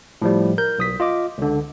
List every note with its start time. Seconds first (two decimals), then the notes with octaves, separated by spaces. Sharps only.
0.22 A2 F3 G3
0.58 A#4 G6
0.78 B1 D#6 B6
1.00 F4 D#5 D6
1.38 C#2 D3